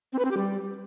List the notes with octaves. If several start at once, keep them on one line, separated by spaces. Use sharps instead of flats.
C4
B4
C4
G4
G3